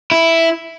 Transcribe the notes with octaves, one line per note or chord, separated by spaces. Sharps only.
E4